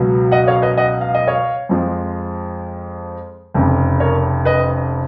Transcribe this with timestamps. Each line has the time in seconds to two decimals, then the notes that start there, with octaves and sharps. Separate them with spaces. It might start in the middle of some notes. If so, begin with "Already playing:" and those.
Already playing: C#2 B2 F#3
0.32 D#5 F#5
0.48 C#5 F5
0.62 B4 D#5
0.77 D#5 F#5
1.01 F5
1.15 D#5
1.27 C#5 F5
1.69 F2 F3 G#3
3.54 F1 F2 C#3
4.00 A#4 C#5
4.45 B4 D#5